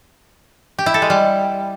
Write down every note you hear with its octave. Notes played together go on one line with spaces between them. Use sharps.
G4
E4
A4
G#3
G3